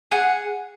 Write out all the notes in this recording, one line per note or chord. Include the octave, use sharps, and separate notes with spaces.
G#4 F#5